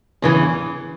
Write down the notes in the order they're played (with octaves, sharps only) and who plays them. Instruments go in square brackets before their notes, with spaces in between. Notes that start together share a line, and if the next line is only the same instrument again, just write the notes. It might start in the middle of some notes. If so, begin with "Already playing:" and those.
[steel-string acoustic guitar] E2 C#3 E3